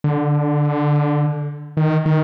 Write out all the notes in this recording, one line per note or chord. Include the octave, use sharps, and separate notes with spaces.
D3
D#3
D#3